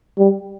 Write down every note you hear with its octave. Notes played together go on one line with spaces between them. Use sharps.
G3